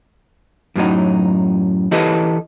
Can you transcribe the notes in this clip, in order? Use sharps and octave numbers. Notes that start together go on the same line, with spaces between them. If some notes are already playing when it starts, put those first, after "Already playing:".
F#2 A2 F#3 D#4
E3 E4 G4 A4 B4 D#5